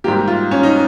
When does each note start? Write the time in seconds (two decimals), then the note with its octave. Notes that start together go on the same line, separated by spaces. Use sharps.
0.04 G#2 G3 A#3 G4
0.28 F4
0.51 C#4
0.63 D#4